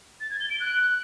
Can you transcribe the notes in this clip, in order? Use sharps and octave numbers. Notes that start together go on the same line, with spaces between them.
A6
G#6
G7
D7
F#6